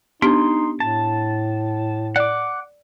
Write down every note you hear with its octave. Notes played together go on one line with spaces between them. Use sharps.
B3 D4 D#4 G4 C6
A2 A5
D5 F#5 D6